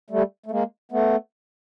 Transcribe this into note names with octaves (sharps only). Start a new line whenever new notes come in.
G3 A3
A3
G#3 A#3
A3 B3